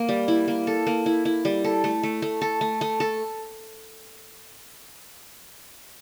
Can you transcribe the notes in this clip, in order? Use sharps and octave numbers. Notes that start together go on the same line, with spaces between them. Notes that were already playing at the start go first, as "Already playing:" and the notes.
Already playing: A#3
G3
E4
A#3
A4
A#3
E4
E4
G3
A4
A3
A3
A3
A4
A3
A3
A4